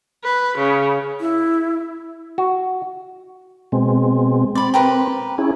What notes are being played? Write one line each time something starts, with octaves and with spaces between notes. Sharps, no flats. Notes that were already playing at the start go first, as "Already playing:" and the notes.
B4
C#3
E4
F#4
B2 G#3 C4
C4 D5 B5
G4 A#4 B4
C#4 E4 G#4